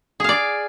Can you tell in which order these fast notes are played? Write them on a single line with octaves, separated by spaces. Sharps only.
G#4 F5 D5